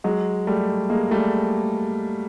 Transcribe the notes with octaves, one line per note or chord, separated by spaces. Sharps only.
F#3 G#3
G3 A3
G#3 A#3
G3 A3